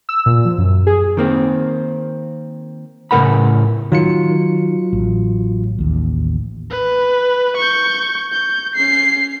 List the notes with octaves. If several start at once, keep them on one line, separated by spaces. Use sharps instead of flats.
E6
A#2
F3
F#2
G#4
D#3 A#3 C4
A2 C#3 C4 A#4 F#5 B5
D#3 F#3 F4 C#7
A1
A1 D#2
B4
C#6 G6
G6
C#4 C7